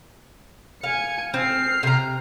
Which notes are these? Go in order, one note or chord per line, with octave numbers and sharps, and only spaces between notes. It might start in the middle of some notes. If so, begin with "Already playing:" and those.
F5 G#5 C#7
C4 F6 C7
C3 A#5